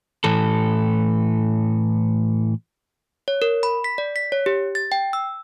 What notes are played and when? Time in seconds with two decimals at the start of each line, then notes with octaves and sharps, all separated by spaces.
0.24 A2 E3 A4
3.28 C#5
3.42 A#4
3.63 B5
3.84 B6
3.98 D5
4.16 B6
4.32 C#5
4.46 G4
4.75 A6
4.92 G5
5.13 E6